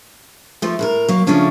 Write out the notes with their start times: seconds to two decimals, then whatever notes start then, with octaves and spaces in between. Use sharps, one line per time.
0.62 F3 A3
0.79 A2 A4 A#4
1.09 F#3 A#3
1.27 C#3 F3 A3 C#4 D4